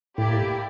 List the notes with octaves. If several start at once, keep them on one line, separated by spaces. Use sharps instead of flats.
A2 A#3 E4 G4 D5